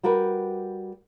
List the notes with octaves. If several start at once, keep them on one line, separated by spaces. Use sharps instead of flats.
G3 F#4 G4 A#4 B4